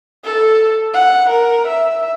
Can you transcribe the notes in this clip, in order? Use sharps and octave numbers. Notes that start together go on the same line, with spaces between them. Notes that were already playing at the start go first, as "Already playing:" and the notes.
A4
F#5
A#4
E5